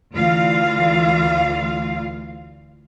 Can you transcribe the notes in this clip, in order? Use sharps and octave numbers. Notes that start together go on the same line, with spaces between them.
D2 E3 F4 F5